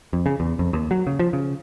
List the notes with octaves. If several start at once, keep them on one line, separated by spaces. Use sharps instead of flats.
F2
C#3
E2
F2
D#2
F#3
C#3
F3
C#3